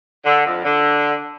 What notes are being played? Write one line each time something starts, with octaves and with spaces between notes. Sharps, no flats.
D3
F2
D3